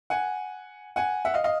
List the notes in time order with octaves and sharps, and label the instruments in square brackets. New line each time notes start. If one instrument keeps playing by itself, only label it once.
[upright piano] F#5 G#5
F#5 G#5
E5 F#5
D#5 F5
D#5 F5